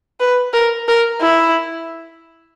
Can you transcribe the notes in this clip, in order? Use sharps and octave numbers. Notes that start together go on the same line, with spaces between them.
B4
A#4
A#4
E4